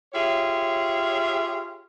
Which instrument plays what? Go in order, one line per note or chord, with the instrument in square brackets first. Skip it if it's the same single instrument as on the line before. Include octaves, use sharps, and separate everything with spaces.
[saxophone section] F4 G4 G#4 C#5 E5